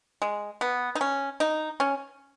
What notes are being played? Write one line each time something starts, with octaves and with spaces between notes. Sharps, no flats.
G#3
B3
D#4
C#4
D#4
C#4